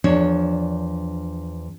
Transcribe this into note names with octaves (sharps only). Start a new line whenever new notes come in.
E2 F3 D4 C#5